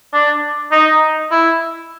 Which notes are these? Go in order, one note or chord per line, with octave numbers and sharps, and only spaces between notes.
D4
D#4
E4